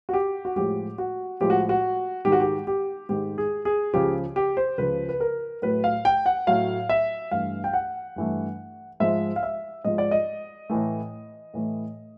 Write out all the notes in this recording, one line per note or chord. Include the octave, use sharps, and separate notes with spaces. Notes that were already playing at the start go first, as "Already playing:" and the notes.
F#4
G4
F#4
A2 F3 G#3 G4
F#4
A2 F3 G#3 G4
F#4
F#4
G#2 D#3 G#3 G4
F#4
G4
G4
G#2 D#3 G#3 G4
G#4
G#4
C#2 C#3 F3 G4
G4
C5
C#2 C#3 F3 B4
B4
A#4
A2 F#3 A3 B4
F5
G5
F#5
A2 F#3 A3 F5
E5
G2 E3 A3 F5
G5
F#5
G2 E3 A3
G#2 F3 G#3 E5
F5
E5
G#2 F3 G#3 D#5
D5
D#5
A2 E3 A3
A2 E3 A3